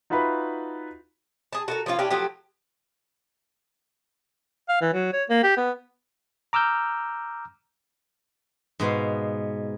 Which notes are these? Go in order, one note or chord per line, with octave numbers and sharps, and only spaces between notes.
D#4 F4 F#4 B4 E5 B5
G#4 A5
F#4 A4 A#4
F3 A#3 C#4 F4
C#4 D4 E4 G4
F3 F#3 A3 G4
F5
E3
F#3
C#5
A#3
G4
B3
A#5 D6 E6 F6 G6
G#2 B2 B3 F5